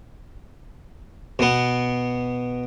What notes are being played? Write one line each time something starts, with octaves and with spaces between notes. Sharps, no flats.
B2 B3